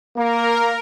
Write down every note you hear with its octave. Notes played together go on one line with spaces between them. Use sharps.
A#3 A#4